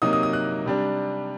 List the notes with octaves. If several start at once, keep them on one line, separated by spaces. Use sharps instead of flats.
C3 F#3 A#3 D#4 D#6
D#6
D#6
F#6
C3 G3 D4